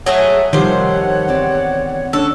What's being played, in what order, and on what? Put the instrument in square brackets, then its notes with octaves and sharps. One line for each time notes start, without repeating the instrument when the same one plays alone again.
[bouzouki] F#3 A3 G#4 [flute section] E5 F#5 G#5
[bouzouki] C3 C5 [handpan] D#3 [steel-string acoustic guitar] F3 G3 [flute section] C#5 F#5
[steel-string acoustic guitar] E2 C4 D5
[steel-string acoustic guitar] D3 C#4 D4 [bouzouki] A4